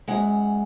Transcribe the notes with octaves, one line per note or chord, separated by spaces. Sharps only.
F#2 D#3 G#3 F#5